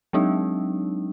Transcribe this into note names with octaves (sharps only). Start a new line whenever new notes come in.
F#3 G#3 C4 D4 D#4